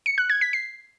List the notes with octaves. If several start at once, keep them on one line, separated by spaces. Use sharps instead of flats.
C#7
F#6
G#6
B6
C7